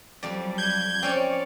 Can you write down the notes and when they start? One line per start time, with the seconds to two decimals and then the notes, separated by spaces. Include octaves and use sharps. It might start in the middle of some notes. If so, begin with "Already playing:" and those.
0.23 F2 F#3 G3 D5
0.58 G6 G#6
1.03 C4 C#4 C#5 D5